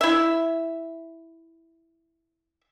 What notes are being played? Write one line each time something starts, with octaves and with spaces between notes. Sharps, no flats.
E4 E5